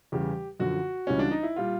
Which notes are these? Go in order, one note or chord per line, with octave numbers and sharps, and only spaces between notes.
E2 C#3 E3 G3 G4
F#2 D3 F3 F#4
C#2 C#3 E3 G3 C#4
D4
D#4
E4
A#2 G3 F4